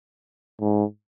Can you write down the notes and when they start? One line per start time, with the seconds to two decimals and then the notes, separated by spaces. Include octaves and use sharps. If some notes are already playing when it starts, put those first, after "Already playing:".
0.61 G#2